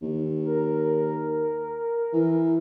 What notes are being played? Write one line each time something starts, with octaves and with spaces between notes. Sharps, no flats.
D#2
A#4
E3